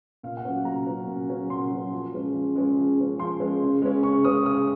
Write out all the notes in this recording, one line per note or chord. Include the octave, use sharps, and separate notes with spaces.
A#2 F5
F#5
F#3 C#4
A#2 A#5
F#3 C#4
A#2
F#3 C#4
A#2 C6
F#3 C#4
F3
G#3 C#4
F3
G#3 C#4
F3
G#3 C#4
F3 C6
G#3 C#4
C#3
G#3 C#4
C#3 C#6
G#3 C#4 D#6
C#3 D#6